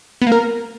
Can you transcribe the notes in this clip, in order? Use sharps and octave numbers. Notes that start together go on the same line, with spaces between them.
B3
A#3
A#4